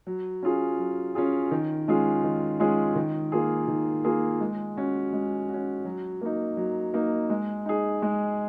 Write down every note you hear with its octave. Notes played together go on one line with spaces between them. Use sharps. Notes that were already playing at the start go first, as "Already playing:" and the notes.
F#3
C#4 F4 G#4
F#3
C#4 F4 G#4
D#3
G#3 C#4 F4 G#4
D#3
G#3 C#4 F4 G#4
D#3
A#3 F4 G#4
D#3
A#3 F4 G#4
G#3
C#4 F#4
G#3
F#4
C#4
F#3
A#3 D#4
F#3
A#3 D#4
G#3
D#4 G#4
G#3